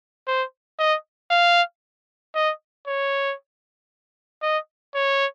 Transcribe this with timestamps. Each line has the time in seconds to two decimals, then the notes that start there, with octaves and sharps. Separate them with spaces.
0.27 C5
0.79 D#5
1.31 F5
2.35 D#5
2.87 C#5
4.42 D#5
4.95 C#5